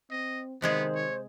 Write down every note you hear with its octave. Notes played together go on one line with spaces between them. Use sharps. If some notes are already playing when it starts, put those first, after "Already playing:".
C4 D#5
C3 D#3 G#3 B3 G#4 C5
C#5